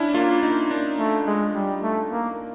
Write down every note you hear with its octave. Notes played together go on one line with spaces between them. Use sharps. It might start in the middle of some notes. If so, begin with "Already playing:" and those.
Already playing: C#4 D4 E4
A#3 F4
D#4
D4
A3
G#3
G3
A3
A#3